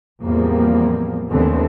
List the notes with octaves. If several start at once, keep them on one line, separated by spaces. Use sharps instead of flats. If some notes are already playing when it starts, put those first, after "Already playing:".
E2 A2 F3 G3 A#3 C4
D#2 D3 E3 A3 B3 C4